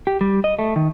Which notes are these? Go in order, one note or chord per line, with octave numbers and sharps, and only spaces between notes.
G4
G3
D#5
A3
D#3